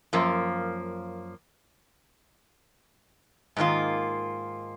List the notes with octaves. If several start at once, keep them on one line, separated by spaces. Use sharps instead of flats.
F#2 F3 A#3
G#2 D#3 A#3 F4